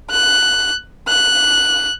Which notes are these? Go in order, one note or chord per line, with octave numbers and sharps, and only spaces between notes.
F#6
F#6